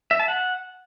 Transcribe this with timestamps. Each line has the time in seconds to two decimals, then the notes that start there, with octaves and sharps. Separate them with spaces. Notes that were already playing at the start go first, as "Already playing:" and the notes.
0.11 E5
0.20 A5
0.28 F#5